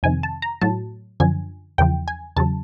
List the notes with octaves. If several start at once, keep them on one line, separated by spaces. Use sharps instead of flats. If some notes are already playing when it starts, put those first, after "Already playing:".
F2 C3 D#3 G#5
A5
A#5
A2 F#3 A5
F#2 D3 F3 G#5
E2 C#3 F3 G5
G#5
E2 C#3 F#3 A5